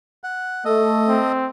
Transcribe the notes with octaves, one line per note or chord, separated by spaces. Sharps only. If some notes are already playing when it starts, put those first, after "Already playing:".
F#5
A3 A4 D#5
C4